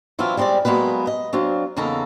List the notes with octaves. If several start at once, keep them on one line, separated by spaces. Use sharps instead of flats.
E3 F#3 C4 D4 E4 F4
G3 G#3 C4 G4 D5
F#3 G#3 A#3 B3 B4
D#5
F#3 C4 D4 F4
E2 C#3 A#3 D#4 A4 A#5